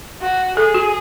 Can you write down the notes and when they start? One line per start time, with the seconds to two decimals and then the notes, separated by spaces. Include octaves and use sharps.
0.22 F#4
0.57 G#4 A4
0.74 F#4